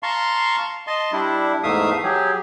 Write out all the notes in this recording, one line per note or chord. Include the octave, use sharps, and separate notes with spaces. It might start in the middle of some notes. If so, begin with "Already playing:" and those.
F5 A5 A#5 C6 C#6
D#5 A5 C6
G3 D4 E4
E2 G#2 A3 E5 F5 D#6
F#3 G4 G#4